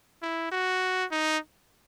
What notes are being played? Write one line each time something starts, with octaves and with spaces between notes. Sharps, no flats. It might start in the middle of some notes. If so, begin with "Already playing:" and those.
E4
F#4
D#4